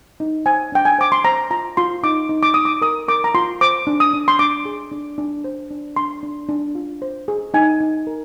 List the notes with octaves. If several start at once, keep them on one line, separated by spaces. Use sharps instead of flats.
D#4
C5 G#5
D4 G5
G#5
C5 D6
C6
C5 A#5
F4 A#5
F4 C6
D#4 D6
D#4
D6
D#4 D#6
D6
A#4 D#6
A#4 D6
A#5
F4 C6
C5 D6
D4
D#6
D4
C6
D4 D6
G#4
D4
D4
C5
D4
D4 C6
D4
D4
F4
C5
G#4
D#4 G#5
D#4
A#4